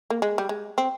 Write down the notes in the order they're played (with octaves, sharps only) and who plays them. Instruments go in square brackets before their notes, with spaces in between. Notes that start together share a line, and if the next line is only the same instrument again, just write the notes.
[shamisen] A#3
G#3
G3
G#3
C4